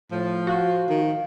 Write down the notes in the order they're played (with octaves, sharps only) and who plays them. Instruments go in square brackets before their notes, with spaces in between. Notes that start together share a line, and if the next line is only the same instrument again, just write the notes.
[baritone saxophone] A2 [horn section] F3
[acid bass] F#4 [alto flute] F5
[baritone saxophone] D#3